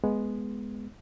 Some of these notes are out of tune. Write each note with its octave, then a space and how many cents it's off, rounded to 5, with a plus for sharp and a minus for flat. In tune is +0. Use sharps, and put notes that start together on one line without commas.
G#3 +5 B3 +0